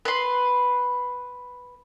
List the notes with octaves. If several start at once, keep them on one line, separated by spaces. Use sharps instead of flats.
B4 C6